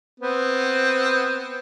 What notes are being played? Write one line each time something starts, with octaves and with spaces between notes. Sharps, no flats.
B3 C4